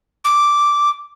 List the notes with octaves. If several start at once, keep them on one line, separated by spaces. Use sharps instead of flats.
D6